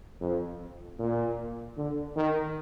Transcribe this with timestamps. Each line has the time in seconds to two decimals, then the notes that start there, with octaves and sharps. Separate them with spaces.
0.21 F2
0.99 A#2
1.77 D3
2.16 D#3